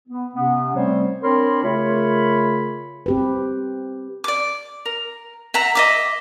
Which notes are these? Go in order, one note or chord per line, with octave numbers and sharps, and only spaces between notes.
B3
C3 B3 C#4
G3 A3 C4 C#4 C5 C#5
C4 D4 A#4 C#5 B5 C6
C#3 A3 F4 A#4 C#5 B5
C4 G4 B4
D5 D6
A#4
E5 F#5 A#5
D#5 E5 D6